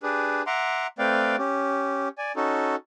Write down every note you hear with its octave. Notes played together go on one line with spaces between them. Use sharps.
D4 G4 G#4 B4
E5 F#5 A#5 C6 D6
A3 C4 B4 D5 F5 G5
C#4 G4
D5 G#5
C#4 D#4 F#4 A4